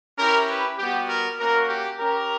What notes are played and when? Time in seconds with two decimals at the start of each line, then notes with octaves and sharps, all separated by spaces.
0.18 C#4 E4 G4 A#4
0.49 B4
0.78 G3 B3 F#4 G4
1.09 A#4
1.39 A#3 C#4 F#4 A#4
1.69 G4
1.99 C#4 G4 A#4